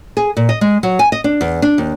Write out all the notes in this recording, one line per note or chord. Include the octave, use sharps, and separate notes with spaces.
G#4
A#2
D#5
G#3
F#3
G#5
D#5
D4
E2
D4
D#2